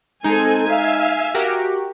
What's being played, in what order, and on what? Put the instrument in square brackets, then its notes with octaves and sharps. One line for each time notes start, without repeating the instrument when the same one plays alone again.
[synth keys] G#3 D#4 [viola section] C4 A4 G#5
[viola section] E5 F5 G#5
[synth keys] F#4 G4 A#4